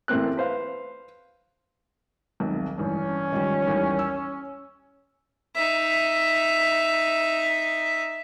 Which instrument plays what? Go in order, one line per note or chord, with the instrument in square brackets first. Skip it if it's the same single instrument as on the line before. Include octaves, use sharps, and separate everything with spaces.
[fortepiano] A1 A2 A#3 C4 F#6
B4 C5 F5
[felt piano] D#1 B1 C3
[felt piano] A1 G2 [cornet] C#4
[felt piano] D#3 F3 G3
A1 D#2 G3
E6
[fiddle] D#4 E5